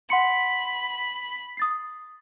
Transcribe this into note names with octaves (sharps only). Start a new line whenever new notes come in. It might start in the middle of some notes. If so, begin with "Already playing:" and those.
F#5 B5 C6 C#7
D#6 A6 C7